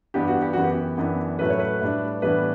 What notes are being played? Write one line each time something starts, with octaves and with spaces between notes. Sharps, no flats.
G2 E3 B3 D4 G4
F#4
G4
F#2 E3 B3 F#4
G4
F#2 E3 B3 D4
A2 F#3 A3 C#4 B4
C#5
B4
A2 G3 D4
A2 E3 G3 B3 D4 B4